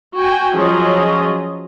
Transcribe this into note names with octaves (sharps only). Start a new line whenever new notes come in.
F#4 G5 G#5
F3 F#3 C#4 G#4 D#5